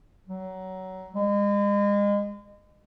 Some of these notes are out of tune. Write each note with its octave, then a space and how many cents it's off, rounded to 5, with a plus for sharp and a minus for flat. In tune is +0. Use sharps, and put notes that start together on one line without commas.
F#3 +20
G#3 -35